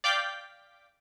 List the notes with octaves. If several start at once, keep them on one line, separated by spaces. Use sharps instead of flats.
D5 F5 G5 D6 G6 B6